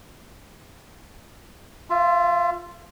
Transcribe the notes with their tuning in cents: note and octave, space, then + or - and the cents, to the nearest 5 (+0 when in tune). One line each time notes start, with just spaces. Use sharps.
F4 +0 E5 +35